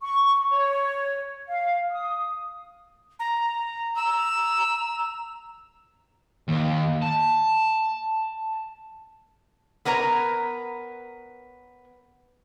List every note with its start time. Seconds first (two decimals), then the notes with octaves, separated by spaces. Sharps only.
0.01 C#6
0.51 C#5
1.48 F5
1.91 D#6
3.19 A#5
3.96 A#5 E6
6.48 D#2
7.02 A5
9.85 B3 A#4 B4 C#5 A#5